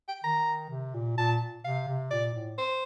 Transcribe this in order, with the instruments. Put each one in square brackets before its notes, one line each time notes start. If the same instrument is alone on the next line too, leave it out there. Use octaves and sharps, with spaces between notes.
[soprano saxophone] G5
[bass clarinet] D#3 [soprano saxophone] A#5
[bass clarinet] C3
A#2
[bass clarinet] A#2 [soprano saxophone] A5
[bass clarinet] C3 [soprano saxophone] F5
[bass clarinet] C3
[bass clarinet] A#2 [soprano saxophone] D5
[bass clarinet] A2
[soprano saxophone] C5